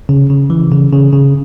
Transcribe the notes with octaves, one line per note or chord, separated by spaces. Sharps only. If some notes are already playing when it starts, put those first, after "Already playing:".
C#3
C#3
E3
C#3
C#3
C#3